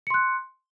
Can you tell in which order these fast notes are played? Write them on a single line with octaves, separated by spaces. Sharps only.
C#7 C6 F#6